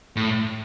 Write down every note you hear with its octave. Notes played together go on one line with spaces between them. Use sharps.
A2